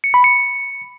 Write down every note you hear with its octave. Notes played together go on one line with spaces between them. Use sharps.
C#7
B5
C#7